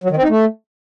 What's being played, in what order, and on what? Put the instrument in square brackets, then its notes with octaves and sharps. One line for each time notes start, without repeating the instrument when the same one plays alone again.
[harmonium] F#3
D#3
C4
D#4
A3